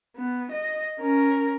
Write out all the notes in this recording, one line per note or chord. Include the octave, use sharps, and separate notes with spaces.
B3
D#5
C#4 A#4